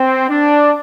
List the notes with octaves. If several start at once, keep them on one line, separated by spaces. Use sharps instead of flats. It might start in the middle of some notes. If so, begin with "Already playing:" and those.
Already playing: C4
D4